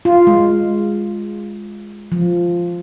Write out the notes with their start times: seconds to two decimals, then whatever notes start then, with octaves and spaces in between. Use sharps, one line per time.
0.05 F4
0.27 G#3
2.12 F3